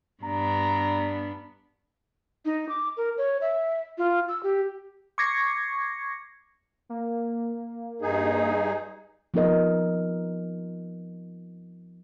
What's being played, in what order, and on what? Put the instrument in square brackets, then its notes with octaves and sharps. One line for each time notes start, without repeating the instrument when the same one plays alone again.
[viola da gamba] G2 B3 D4 [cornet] A#5
[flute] D#4
D6
A#4
C#5
E5
F4
E6
G4
[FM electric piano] C#6 D6 G#6 A#6 C7 C#7
[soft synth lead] A#3
[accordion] G2 D#4 G#4
[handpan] F3 B3 D#4 A#4 D#5